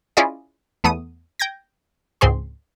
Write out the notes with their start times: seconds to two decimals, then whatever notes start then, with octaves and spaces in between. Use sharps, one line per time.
0.17 C#4 E4 F4 G#4 D5 D#5
0.84 E2 A3 B3 D#6
1.39 G5 G6 G#6 A#6
2.21 C#2 G#2 C4 G#4 C6